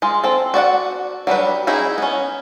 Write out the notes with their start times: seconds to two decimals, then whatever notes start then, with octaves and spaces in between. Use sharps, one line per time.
0.02 G#3 F4
0.24 C4 A4
0.54 F#4 D5 D#5 F#5
1.27 F#3 G3 D4 B4
1.67 C#4 D#4 E4 G#4
1.98 B3 C#4